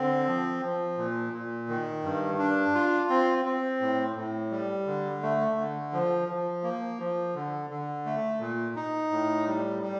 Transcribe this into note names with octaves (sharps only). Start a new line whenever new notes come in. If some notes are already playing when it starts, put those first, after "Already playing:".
Already playing: D3 C4
F3
F3
A#2
A#2
D#3
G2
D4
F4
C4
C4
A2
A2
G3
D3
A3
D3
F3
F3
A#3
F3
D3
D3
A3
A#2
D#4
A2
G3
G3